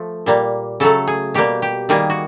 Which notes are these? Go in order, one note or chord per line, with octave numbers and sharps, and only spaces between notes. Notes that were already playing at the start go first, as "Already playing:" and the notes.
Already playing: F3 A3
A#2 G3 A#3
C#3 F#3 A3 A4
G#4
B2 G3 A#3 G4
G4
D#3 G3 A#3 G#4
F#4